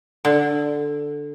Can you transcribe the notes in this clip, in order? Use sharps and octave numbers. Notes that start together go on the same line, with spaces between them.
D3